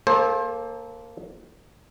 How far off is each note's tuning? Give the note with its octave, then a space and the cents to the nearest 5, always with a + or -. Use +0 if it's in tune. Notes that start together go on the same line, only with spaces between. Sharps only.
A#3 -5 A4 -20 C5 +30